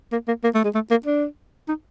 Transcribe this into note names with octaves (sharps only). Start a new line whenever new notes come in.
A#3
A#3
A#3
A3
G#3
A3
A#3
D4
D#4